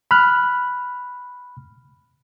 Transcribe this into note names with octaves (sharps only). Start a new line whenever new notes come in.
B5 F6 F#6